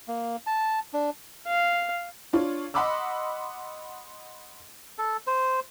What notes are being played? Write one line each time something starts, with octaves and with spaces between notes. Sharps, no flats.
A#3
A5
D4
F5
D4 F4 C#5
D#5 F#5 B5 C6 D6 E6
A4
C5